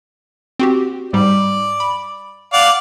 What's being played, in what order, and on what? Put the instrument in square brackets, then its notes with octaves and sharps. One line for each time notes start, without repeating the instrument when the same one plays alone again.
[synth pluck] C4 F#4 G4
[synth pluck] G#2 G3 [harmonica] D5
[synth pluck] B5
[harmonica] D5 F5 F#5